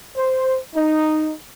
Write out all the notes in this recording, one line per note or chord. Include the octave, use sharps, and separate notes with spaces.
C5
D#4